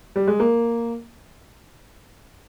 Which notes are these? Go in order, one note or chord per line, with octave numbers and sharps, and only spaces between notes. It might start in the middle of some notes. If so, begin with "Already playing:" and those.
G3
G#3
A#3